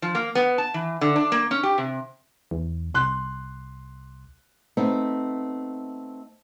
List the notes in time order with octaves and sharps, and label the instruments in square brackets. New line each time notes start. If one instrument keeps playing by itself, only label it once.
[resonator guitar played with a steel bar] F3
A#3
B3
A5
E3
D3
D4
A#3
C#4
G4
C3
[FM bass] E2
[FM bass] C2 [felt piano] C6 F#6
[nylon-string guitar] A3 B3 C4 D#4